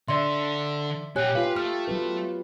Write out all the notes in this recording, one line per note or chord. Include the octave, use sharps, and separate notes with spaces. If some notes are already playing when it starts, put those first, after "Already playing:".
D3 D5 E5 C6
A#2 G4 C#5 F#5 G#5 F#6
F4 B4 F5
A3 F6
F#3 F4 B4